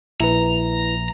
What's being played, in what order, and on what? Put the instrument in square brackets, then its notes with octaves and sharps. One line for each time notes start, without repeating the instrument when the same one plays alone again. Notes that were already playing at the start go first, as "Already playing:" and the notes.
[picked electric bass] A#1 [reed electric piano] E4 B4 [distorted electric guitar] A#5